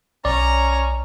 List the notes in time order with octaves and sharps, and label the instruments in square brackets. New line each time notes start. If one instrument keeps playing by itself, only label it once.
[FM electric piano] B1 [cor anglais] C#4 [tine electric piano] D5 [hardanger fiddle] A#5